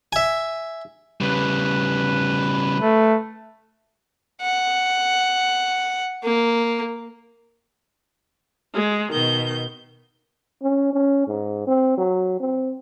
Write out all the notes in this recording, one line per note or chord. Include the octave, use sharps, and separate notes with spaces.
E5 G#5
C#3 G3 B4
A3
F#5
A#3
G#3
B2 D#3 G6
C#4
C#4
G#2
C4
F#3
C4